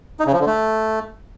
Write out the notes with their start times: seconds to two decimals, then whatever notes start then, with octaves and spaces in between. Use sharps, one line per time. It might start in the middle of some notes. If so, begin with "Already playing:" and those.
0.20 D#4
0.26 C#3
0.33 F3
0.40 D3
0.46 A3